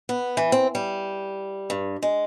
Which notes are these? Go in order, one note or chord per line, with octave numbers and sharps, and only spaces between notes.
B3
E3
C4
G3
G2
G#3